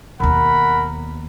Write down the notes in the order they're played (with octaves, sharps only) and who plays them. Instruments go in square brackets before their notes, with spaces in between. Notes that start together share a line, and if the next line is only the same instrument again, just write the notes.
[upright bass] D#2 B2 [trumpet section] A#4 F#5 B5